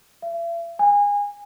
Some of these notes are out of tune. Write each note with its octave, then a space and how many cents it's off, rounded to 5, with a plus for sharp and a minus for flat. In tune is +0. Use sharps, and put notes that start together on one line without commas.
E5 +45
G#5 -25